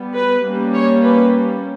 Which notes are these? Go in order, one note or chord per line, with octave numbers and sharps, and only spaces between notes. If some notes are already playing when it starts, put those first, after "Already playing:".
Already playing: G3 B3
B4
G3 A#3 C#4
C#5
B4